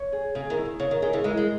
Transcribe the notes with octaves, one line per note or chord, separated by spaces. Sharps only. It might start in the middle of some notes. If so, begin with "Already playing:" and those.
Already playing: C#5
G#4
C#3 G#4
D#3
E4
C#3
C#3 C#5
D#3
D#3 G#4
C#3 E3
E3 G#3 A#4
G#3